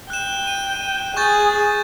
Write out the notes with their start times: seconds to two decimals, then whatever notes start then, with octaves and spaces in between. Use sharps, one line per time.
0.10 G5 F#6 E7
0.47 D#7
1.17 G#4 C#6 G6 A6